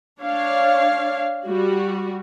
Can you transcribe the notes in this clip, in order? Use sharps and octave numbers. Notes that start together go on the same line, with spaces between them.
D4 C#5 F5
G3 F#4